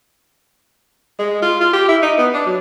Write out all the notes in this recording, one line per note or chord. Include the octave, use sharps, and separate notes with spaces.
G#3
F4
F4
G4
E4
D#4
B3
D4
F#3